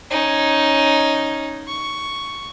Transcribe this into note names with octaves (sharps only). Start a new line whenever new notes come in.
C#4 D#4
C#6